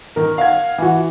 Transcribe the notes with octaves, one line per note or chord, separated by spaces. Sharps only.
D#3 A#4
F5 F#5 G#6
E3 F#4